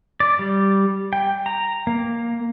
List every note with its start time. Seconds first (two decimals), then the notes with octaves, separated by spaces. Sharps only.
0.20 D5
0.39 G3
1.13 G5
1.46 A#5
1.87 A#3